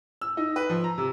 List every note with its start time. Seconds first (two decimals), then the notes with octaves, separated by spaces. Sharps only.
0.21 E6
0.37 D#4
0.56 B4
0.70 F3
0.84 A#5
0.98 C3